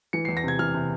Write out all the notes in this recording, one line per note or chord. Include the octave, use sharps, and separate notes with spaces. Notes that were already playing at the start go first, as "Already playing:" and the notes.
E3 C#7
E2 C7
A#6
C3 G#6
E3 F6
C3